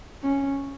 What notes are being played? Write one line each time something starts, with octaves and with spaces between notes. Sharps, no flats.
C#4